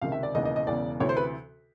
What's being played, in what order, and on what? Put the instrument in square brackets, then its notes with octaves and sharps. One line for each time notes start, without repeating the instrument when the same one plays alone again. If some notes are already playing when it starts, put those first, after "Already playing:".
[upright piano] C#2 C3 D#3 F5
E5
D5
E1 D#2 C#3 E3 D#5
D#5
D#5
E1 E2 C#3 D5
D2 C3 E3 C#5
C5
B4